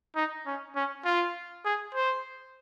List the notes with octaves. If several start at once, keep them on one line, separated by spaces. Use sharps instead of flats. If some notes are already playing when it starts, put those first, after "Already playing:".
D#4
C#4
C#4
F4
G#4
C5